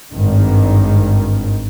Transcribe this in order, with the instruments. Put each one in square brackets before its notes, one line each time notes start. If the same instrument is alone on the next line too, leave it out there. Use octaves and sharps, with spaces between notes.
[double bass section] G#1 G2 D#3